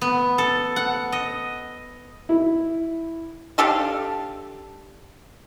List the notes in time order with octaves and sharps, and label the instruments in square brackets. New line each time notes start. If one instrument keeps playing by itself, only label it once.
[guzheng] B3
A4
F#5
D#5
[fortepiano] E4
[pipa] D4 G4 A4 F5